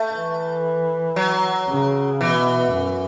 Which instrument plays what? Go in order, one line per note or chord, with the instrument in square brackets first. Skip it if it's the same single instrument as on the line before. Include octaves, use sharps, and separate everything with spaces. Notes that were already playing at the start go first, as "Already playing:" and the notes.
Already playing: [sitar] A3
[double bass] E3
[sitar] F#3
[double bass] C#3
[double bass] B2 [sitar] E3
[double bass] F#2